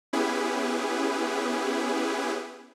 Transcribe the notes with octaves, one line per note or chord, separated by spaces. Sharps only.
B3 C#4 E4 G4 G#4 B4